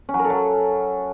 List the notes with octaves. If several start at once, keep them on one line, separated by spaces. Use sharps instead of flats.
C#4
F#3
A#4
A4
F#3